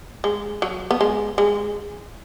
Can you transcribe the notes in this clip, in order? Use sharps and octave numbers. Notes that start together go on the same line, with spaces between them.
G#3
F#3
B3
G#3
G#3